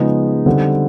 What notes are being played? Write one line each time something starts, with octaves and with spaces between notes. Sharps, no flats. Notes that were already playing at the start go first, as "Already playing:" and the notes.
Already playing: C#3 F3 G#3 B3 D#4
D3 G3 C4 D#4